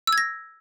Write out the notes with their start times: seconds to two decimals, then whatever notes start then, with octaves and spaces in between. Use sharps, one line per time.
0.07 E6
0.13 G#6
0.18 A#6